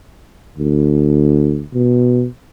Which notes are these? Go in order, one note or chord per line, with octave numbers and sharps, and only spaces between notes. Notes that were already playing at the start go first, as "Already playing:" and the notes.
D2
B2